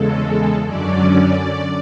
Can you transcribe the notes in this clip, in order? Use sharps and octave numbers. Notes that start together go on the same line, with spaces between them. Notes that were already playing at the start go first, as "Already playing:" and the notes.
Already playing: E2 C#3 G#3 A4
F#2 D3 F#3 C#4 D5